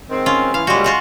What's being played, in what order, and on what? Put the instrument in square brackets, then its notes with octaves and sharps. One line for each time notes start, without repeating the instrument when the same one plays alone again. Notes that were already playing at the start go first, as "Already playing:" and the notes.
[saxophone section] G#2 D#3 C4
[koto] C#4 F4
[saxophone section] E3 [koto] F5
[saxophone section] A#2 C#3 G3 [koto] G#3 F#4
[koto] F4 F#4 F#5